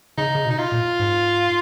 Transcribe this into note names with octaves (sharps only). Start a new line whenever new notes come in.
C#3 D#4
C#3
B2
D#4
F4
A#2
G#2